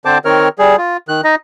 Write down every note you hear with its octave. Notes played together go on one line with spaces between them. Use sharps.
D3 C4 C5 A5 D6
D#3 C4 A#4 C#5 F6
G3 G#4
F4
D#3 F#6
D#4 D#5